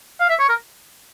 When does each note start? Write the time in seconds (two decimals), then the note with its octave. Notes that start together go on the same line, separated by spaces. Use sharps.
0.20 F5
0.29 E5
0.39 C#5
0.49 A#4